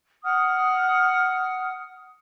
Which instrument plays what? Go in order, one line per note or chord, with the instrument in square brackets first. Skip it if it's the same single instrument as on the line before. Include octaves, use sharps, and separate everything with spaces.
[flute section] F#5 D#6 F6